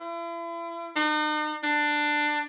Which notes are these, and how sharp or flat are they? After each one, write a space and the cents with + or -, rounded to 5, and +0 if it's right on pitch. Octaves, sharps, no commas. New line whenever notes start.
E4 +40
D#4 -40
D4 +15